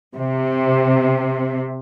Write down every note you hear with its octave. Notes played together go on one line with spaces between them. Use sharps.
C3